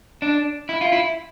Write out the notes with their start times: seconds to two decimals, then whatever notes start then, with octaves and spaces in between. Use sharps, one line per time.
0.22 D4
0.69 E4
0.81 F4
0.92 E4